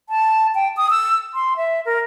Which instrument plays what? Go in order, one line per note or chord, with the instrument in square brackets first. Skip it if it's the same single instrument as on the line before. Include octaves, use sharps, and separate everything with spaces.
[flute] A5
G5
D#6
E6
C6
E5
A#4